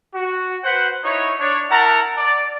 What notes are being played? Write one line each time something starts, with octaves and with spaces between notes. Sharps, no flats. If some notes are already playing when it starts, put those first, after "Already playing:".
F#4
B4 C5 F#5
D#4 E4 C#5
D4 C#5
E4 A#4 F#5 A5 A#5
D5